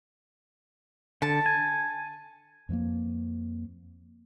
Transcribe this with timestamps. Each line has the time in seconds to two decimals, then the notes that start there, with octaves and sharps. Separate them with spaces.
1.22 D3 A5
1.46 G#5
2.69 F2 F3 A3 A#3